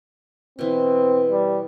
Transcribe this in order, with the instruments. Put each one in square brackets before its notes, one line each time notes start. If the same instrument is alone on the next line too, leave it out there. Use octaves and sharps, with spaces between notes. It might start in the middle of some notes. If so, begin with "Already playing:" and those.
[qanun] B2 E3 [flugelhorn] C4
[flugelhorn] G3